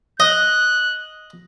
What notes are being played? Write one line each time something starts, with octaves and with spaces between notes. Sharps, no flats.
D#5 F#6